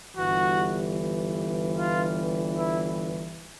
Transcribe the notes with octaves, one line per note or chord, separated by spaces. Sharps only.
G1 G2 E3 F#4
F4
E4